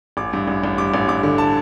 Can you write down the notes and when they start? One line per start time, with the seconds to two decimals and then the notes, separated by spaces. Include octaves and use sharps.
0.17 A1 D6
0.33 G2
0.48 A1
0.64 A1
0.78 G2 D6
0.94 A1
1.08 G2 D6
1.23 D3
1.38 A5